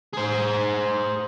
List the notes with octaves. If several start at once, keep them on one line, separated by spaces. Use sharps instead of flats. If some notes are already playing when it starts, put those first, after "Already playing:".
G#4 C5